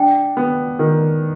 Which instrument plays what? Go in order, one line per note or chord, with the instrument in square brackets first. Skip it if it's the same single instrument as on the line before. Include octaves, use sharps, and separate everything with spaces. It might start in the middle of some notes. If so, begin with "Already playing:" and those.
Already playing: [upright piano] D4 [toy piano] G5
[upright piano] B3
D#3